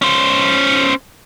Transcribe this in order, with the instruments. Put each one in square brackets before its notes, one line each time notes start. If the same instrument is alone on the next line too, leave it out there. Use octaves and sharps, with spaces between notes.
[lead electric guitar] C#4 C5